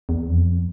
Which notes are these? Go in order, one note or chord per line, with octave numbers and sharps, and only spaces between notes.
E2
F2